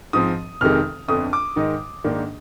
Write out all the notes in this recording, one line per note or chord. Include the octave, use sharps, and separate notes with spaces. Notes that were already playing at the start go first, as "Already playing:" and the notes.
G#2 F3 C4 D#6
F1 F2 C3 D#3 G#3 F6
G1 F2 D3 D#6
D6
G#2 D#3 G#3 D#4
A#1 G#2 D#3 A#3 D4